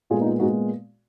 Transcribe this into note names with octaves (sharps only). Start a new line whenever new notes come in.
A#2 G#3 B3 F4 G#4
D#4
F4
A#2 G#3 B3 D#4 F#4